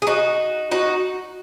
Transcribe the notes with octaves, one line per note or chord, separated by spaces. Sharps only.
G#4
D#4 F#4
D#4 F#4